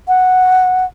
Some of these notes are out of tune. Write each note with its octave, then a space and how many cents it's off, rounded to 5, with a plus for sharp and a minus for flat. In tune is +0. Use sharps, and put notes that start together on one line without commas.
F#5 -5